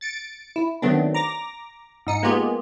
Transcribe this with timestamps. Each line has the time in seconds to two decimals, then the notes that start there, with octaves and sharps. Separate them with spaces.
0.01 A6 C#7 D7
0.56 E4
0.82 D#3 F#3 A3 B3 C4 D4
1.14 A#5 D6 A#6
2.07 G#2 D#4 C#7
2.22 G#3 A#3 B3 F4 G4 G#4